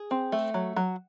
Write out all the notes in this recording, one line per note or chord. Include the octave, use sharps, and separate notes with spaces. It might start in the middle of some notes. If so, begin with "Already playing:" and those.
Already playing: G#4
C4
A3
F#3
F#3